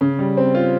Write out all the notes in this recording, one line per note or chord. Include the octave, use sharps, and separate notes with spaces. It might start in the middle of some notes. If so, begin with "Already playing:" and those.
C#3
G3
C4
F4